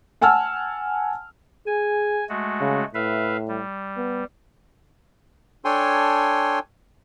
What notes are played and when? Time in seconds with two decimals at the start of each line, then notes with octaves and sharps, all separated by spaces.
0.21 F#5 G#5 A5 E6 F6
1.66 G#4 G#5
2.29 G#3 A3 F#4
2.60 C#3
2.94 A2 B4 E5 F5
3.48 G3
3.97 B3
5.65 D4 A4 C#5 G5 G#5 C6